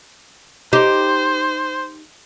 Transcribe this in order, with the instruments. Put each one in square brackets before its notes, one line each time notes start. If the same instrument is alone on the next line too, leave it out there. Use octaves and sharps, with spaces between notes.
[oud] D#4 G4 [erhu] C5